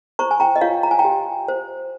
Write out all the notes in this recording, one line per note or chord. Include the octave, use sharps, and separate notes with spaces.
C5 A#5 C#6
G#5
G5 A#5
D#5
F4 C#5 F5
A#5
G#5
G5 A#5
G4
C5